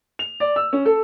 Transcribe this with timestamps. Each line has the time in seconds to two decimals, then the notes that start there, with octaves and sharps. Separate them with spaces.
0.19 F7
0.40 D5
0.56 E6
0.73 C#4
0.85 A4